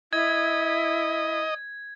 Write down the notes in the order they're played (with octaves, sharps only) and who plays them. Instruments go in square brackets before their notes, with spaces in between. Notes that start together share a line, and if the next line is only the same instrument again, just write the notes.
[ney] E4 [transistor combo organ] D#5 [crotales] G#6